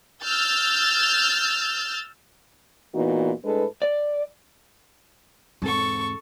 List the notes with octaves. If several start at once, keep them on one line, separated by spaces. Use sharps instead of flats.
E6 F6 G6 A6
E2 A#2 E3 B3 D#4 F#4
A2 G#3 D4 A4 B4
D5
E1 G#2 C4 A4 C#6